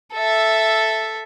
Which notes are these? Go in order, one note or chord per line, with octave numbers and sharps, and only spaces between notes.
A4 E5